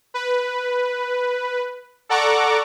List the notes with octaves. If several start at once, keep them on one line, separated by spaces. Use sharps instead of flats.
B4
A4 D5 F#5 A#5 C#6 D6